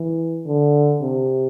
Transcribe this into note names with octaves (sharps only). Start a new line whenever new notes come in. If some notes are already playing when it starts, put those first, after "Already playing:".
Already playing: E3
D3
C3